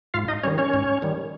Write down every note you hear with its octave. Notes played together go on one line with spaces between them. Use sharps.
G#2 F4 F5
D#4 D#5
D#3 G3 C#4 C#5
C#4 C#5
G#2
D#3 G3